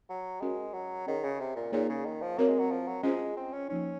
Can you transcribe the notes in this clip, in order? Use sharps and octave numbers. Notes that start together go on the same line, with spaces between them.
F#3
G#3 C#4 F#4 A#4 C#5
F#3
D#3 C#4 G#4 C#5
C#3
C3
A#2
A#2 A#3 D#4 G#4 C#5
C#3
D#3
F3
A#3 C4 F#4 A#4 C#5
G#3
F#3
F3
F#3
G#3 C#4 F4 G#4 C5
C4
C#4
F3 A#3 C#4 D#4